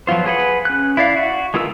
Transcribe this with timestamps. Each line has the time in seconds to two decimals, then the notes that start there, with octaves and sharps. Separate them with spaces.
0.07 F3 F#3 B3 F4 C5
0.26 G#4 B4 F#5
0.65 C#4 F#6
0.97 E4 D5 F5
1.17 F#4
1.54 G#3 B3 F4 A#4 E6